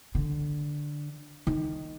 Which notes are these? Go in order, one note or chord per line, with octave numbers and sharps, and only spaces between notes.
D3
D#3